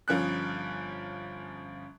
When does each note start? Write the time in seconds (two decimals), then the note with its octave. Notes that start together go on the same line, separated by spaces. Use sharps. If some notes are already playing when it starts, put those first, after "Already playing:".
0.08 G1 F3 C#4 F#6